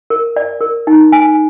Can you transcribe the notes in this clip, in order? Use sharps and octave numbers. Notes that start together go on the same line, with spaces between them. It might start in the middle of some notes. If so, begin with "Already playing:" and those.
A#4
D5
A#4
D#4
G#5